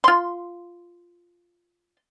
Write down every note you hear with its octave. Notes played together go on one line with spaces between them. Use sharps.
F4 C6